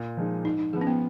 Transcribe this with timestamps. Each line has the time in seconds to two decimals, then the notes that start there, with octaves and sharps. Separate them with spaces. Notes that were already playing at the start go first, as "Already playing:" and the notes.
Already playing: A#2
0.17 F3 G#3 D#4
0.45 G#2 D#4
0.59 D#4
0.73 F3 B3 G#4
0.81 C#4
0.87 B3